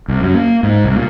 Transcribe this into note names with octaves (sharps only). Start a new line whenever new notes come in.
C2
F#2
A#3
G#2
C2
A#2